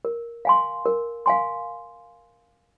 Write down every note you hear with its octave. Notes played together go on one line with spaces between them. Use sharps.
A#4
F5 G#5 C6
A#4
F5 G#5 C6